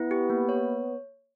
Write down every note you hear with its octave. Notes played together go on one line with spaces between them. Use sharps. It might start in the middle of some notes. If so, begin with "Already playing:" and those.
Already playing: B3 E4
G4
A#3
C#5